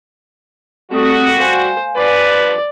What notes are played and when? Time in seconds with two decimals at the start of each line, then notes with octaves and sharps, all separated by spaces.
0.91 G3 A3 C4 F#4 D#6
1.38 C5 F5 G#5
1.96 G2 F3 B4 D5